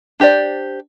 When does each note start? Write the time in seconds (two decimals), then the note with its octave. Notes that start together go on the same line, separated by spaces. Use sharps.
0.20 D4 G4 C5 D5